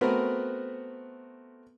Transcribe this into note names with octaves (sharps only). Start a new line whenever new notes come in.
A3 B3 C4 F#4 A#4 B4